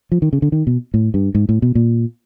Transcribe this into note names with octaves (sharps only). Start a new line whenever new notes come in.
F3
D#3
C#3
D3
D#3
B2
A2
G2
G#2
A2
B2
A#2